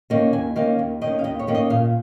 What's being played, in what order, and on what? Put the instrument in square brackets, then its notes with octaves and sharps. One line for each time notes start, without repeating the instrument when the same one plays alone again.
[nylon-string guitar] D#3 A#3 C#4
D#2 G#5
D#3 A#3 C#4 F5
D#2
D#3 A#3 C#4 D#5
F5
D#2 D#5
C#5
D#3 A#3 C#4
D#5
A#2 F5